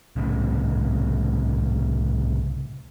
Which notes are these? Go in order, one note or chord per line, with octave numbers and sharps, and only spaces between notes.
C2 A2 C#3